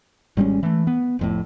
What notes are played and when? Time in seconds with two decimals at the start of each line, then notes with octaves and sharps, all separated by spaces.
0.37 G#1 G3 G#3 C#4
0.63 E3 A3
0.87 B3
1.19 F1 F2 A2